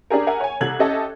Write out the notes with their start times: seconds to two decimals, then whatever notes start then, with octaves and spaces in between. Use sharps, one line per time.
0.10 D4 G4 G#4 A#4
0.27 A#4 E5 F#5 G#5
0.40 C#5 G#5
0.61 C2 A4 F#6 G#6 F#7
0.79 C#4 G4 A4 D#5 E5 A5